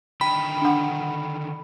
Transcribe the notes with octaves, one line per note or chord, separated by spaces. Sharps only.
D3 D#3 G5 B5
D4 F#5